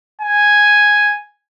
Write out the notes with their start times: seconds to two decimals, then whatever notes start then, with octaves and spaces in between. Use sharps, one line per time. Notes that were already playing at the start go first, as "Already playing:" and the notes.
0.21 G#5